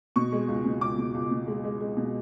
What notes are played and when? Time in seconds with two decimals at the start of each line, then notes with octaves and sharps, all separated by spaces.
0.16 B2 C#6
0.32 G#3
0.48 C#2
0.65 B2
0.81 C#2 D6
0.98 B2
1.14 C#2
1.31 B2
1.48 G#3
1.64 G#3
1.81 G#3
1.97 B2